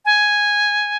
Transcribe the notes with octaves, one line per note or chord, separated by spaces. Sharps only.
G#5